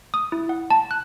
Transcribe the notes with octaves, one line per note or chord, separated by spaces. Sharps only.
D#6
E4
F#5
A5
F#6